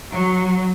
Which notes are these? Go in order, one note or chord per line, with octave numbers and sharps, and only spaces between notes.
F#3